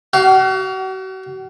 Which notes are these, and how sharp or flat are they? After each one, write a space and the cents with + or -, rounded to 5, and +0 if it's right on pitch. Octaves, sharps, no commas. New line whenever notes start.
F#4 +40 F5 +5